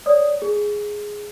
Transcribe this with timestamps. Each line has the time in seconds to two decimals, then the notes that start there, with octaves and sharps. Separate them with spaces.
0.06 C#5 D5 D#6
0.42 G#4